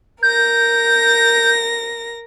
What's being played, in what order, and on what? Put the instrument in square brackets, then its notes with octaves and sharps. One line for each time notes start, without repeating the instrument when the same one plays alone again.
[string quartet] A#4 A#6 [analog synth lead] G6